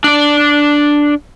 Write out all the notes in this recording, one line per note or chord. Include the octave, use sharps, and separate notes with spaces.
D4 D5